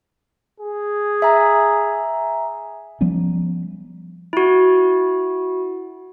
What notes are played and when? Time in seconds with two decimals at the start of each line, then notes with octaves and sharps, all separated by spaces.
0.60 G#4
1.22 E5 G#5 A#5
3.01 F3 G3 B3 C#4
4.33 E4 F#4